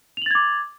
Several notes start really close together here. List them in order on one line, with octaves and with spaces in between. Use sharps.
F7 F#7 A6 G#6 D6